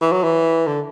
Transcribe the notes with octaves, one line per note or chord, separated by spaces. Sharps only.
E3
F#3
E3
D3